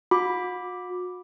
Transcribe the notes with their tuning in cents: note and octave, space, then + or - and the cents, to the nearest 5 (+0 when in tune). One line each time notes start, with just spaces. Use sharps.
F#4 -40 B5 +0 D6 +0